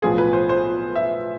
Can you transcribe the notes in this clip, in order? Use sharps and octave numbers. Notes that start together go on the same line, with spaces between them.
B1 A2 F3 B3 F4 G#4
B4
C5
C5
E5